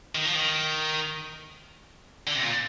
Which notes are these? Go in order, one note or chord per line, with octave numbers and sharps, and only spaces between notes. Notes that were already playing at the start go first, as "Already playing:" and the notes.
D#3
F3
D#3
D3
C3
A#2